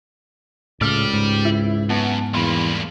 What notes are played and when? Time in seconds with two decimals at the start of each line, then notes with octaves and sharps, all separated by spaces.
0.81 C#2 A2 C#3 G4 D5 E6 F6
1.14 G#2
1.45 E4
1.89 F#2 B3 F#5 A5
2.34 E2 G2 A#3 B5 C6